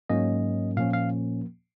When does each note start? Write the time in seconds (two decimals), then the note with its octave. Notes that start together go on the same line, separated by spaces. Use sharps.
0.10 G#2 F#3 A#3 C#4 D#5
0.77 A#2 F3 A#3 C#4 F5
0.93 F5